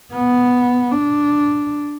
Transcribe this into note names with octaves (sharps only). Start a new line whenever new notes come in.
B3
D4